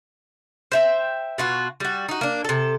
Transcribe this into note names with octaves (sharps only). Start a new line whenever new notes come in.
C5 E5 G5
B2 F4 F#4
G3 F#4
D#4 F#4
A#3 D4
C3 A4